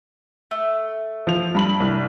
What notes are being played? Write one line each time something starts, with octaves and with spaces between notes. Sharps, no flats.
A3
F3 F7
G2 B5 F#7
C2